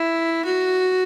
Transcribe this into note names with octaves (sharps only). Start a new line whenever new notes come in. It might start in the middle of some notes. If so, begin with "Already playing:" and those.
Already playing: E4
F#4